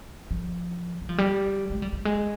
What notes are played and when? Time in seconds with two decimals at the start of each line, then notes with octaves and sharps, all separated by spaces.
0.31 F3
1.01 G3
1.09 F3
1.18 G3
1.70 G#3
1.82 G3
1.93 G3
2.05 G#3